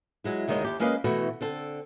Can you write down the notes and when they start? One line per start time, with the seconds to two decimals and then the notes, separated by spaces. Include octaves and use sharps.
0.24 F#3 G#3 E4
0.48 D2 D#3 G3 G#3 C#5 D#5
0.65 D#2 G4
0.80 G#3 A#3 C#4 B4 D#5 F5
1.04 B2 E3 A3 F#4
1.41 D3 C4 A4